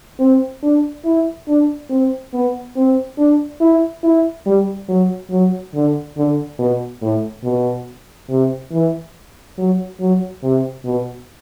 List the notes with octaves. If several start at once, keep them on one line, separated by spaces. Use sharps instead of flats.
C4
D4
E4
D4
C4
B3
C4
D4
E4
E4
G3
F#3
F#3
D3
D3
B2
A2
B2
C3
E3
F#3
F#3
C3
B2